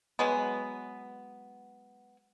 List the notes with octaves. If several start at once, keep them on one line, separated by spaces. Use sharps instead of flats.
F#3 G#3 B3